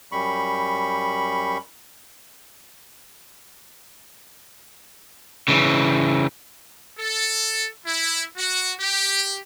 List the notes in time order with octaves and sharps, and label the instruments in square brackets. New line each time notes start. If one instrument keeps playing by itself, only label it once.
[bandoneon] F#2 G3 B5 C#6
[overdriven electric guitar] C#3 E3
[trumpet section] A4
E4
F#4
G4